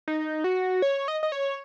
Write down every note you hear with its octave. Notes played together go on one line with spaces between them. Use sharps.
D#4
F#4
C#5
D#5
D#5
C#5